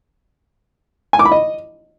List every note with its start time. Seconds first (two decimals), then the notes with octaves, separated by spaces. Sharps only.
1.13 G#5
1.19 D6
1.25 B5
1.32 D#5